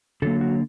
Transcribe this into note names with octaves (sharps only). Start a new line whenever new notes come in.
D3 F#3 A#3 A4
F#4